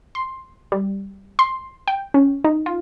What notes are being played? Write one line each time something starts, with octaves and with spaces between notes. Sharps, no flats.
C6
G3
C6
G5
C#4
D#4
F4